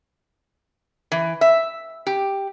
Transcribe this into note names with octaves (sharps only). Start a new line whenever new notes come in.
E3
E5
G4